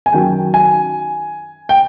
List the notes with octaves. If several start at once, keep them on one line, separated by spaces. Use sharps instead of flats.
G#5
F#2 D#3 F#3 G5
G#5
G5